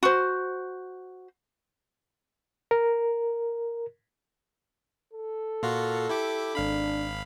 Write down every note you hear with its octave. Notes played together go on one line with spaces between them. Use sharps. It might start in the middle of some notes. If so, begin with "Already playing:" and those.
F#4 C5
A#4
A4
A#2 F4 F#4
E4 G4 D6
G#1 D4 F5 B5